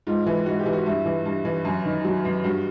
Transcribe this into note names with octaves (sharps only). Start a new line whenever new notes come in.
G#2 F4
E3
G#2 F#4
G4
E3
F#4
G2 E4
E3
G2
E3
F#2
D#3
F#3
F#2
G2 F#4